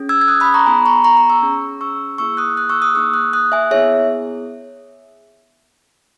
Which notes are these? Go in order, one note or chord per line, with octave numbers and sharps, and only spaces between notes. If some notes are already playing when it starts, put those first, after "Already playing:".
Already playing: C#4 G#4
E6 G#6
G#6
D#6 F#6
B5 D#6
A#5 C#6
B3 D#4 G#4 G#5 B5
A#5 C#6
A#5 C#6
A#5 C#6
C#6 E6
C#4 G#4
C#6 E6
A#3 E4 G#4 C#6 E6
D#6 F#6
D#6 F#6
C#6 E6
D#6 F#6
A#3 D#4 G#4 C#6 E6
D#6 F#6
D#6 F#6
E5 G#5
B3 E4 G#4 C#5 E5